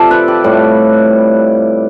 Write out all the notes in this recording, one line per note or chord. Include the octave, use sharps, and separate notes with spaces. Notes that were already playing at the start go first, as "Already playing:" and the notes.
Already playing: C3 F3 F4 A4 D5
B4
G4
A2 G3